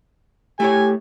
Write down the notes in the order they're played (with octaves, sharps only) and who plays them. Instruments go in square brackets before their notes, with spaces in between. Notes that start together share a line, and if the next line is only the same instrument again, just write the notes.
[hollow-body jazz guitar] A3 E4 C#5 [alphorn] G4 [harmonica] G#5